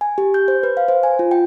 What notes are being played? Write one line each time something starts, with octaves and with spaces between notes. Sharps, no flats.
G#5
G4
G6
C5
B4
F5
C5
G#5
F4
G5